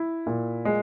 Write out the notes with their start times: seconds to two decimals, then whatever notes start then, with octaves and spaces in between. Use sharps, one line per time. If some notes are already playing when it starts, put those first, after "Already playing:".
Already playing: E4
0.27 A#2
0.65 G#3